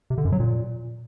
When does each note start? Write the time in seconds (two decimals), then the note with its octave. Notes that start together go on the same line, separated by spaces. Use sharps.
0.10 C3
0.18 D3
0.25 F#2
0.32 F#3
0.40 A#2